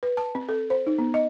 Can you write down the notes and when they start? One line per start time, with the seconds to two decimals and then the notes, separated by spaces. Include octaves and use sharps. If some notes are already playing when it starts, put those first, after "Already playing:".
0.03 B4
0.17 A5
0.35 C4
0.49 A4
0.70 C5
0.87 D#4
0.98 B3
1.14 D#5